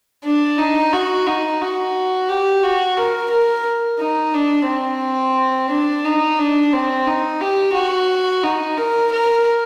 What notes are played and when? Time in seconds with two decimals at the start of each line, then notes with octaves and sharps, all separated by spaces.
0.25 D4
0.58 D#4
0.93 F#4
1.26 D#4
1.61 F#4
2.29 G4
2.63 F#4
2.97 A#4
3.31 A#4
3.99 D#4
4.34 D4
4.68 C4
5.70 D4
6.04 D#4
6.38 D4
6.72 C4
7.07 D#4
7.41 G4
7.75 F#4
8.43 D#4
8.78 A#4
9.12 A#4